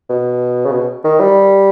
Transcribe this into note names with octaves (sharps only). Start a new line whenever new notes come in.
B2
C#3
B2
D#3
G3